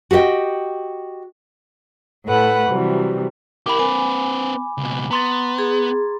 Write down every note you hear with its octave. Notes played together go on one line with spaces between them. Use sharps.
F#4 G4 A#4 D#5 G5
A2 A3 A4 B4 F#5 B5
C3 E3 F#3 G3
E4 G4 A#4 B5 D6
C4 B4 G#5
C#2 B2
B3 A#5 C6 A6
G#4